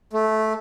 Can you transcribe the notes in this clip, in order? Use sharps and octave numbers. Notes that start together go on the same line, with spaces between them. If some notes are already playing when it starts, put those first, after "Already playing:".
A3